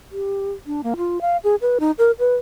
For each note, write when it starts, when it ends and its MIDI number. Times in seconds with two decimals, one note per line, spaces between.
0.12 0.52 67
0.67 0.81 62
0.84 0.94 58
0.97 1.21 65
1.21 1.37 77
1.44 1.56 68
1.62 1.78 71
1.80 1.91 63
1.98 2.11 70
2.19 2.35 71